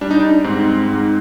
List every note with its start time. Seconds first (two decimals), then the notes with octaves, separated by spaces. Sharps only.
0.01 G3 D4
0.11 D#4
0.20 D4
0.44 G#2 C4
0.88 G#2